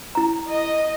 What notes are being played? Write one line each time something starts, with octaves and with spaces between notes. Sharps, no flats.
E4 A#5
D#5